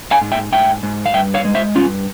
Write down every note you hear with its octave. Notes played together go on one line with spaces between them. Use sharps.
F5 G#5
G#2
E5 G5
G#2 E5 G5
G#2
F5
G2 E5 G5
C#5 F5
G#3
C5 E5
G2 C#4 F4